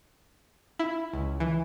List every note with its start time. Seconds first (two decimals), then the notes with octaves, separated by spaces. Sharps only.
0.79 E4
1.13 C#2
1.40 E3